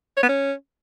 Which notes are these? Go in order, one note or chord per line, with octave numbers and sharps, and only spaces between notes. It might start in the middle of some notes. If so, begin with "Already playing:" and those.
C#5
B3
C#4